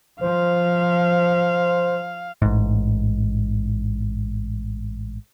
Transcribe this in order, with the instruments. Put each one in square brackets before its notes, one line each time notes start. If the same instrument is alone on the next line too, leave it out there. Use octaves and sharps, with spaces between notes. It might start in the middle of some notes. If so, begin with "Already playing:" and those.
[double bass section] F3 [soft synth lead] C5 [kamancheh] F5
[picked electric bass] A1 G#2